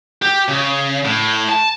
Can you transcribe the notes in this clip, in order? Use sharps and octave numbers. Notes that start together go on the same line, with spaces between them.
G4
C#3
A2
A5